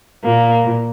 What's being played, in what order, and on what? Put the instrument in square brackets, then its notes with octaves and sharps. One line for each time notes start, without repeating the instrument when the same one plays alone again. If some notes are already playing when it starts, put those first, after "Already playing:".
[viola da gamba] A#2 [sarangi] A#3